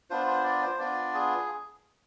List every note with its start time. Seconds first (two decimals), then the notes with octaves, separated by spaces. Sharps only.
0.10 B3 D4 F4 C5
0.27 C5
0.44 D5
0.62 C5
0.79 B3 D4 F4 D5
1.14 G#4